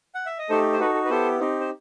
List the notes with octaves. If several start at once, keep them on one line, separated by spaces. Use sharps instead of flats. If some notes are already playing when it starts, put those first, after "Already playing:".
F#5
E5
D#5
A3 D#4 G4 A4 C5
C5
D#4 F#4 A4 B4
A4
B4
B3 E4 G4 A4 C5
C4 D#4 G4
C5